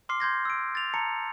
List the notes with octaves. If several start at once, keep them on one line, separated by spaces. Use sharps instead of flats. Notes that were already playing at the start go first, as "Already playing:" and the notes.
C6 D6 F6 C7
C6 G6 G#6 A#6
E6 D7
A6 F7
A5 A#5 C#7